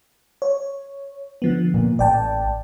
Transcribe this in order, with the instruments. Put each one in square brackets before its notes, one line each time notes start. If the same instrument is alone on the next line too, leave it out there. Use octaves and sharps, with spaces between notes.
[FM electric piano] C#5
D3 F3 B3
[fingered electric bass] A#2
[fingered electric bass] A1 [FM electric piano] D5 G5 A5